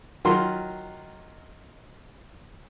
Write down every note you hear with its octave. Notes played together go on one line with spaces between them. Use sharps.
D#3 F#3 F4 C6